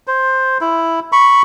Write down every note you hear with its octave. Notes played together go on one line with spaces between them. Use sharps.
C5
E4
B5 C#6